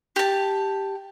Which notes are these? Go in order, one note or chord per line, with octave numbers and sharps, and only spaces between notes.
G4 A5